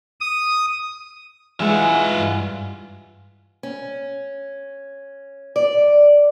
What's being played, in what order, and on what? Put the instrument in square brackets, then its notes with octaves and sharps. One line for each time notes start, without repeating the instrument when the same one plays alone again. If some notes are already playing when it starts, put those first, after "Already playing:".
[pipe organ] D#6
[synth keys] E3 G#3 F#5 [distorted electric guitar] F4 E5 [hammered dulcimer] G#5
[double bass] G2
[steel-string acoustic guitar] C#4
D5